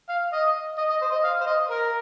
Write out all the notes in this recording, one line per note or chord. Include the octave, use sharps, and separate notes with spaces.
F5
D#5
D#5
D#5
C5
D#5
F5
C5
D#5
A#4